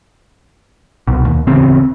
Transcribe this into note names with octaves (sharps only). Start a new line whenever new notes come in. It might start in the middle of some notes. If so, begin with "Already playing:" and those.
C2 B2
D#2
D1 E2 C#3 C4